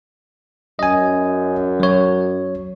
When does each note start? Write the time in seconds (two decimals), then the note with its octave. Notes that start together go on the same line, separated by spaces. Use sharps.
0.79 F#2 D#5 G#5
1.80 F#3 C#5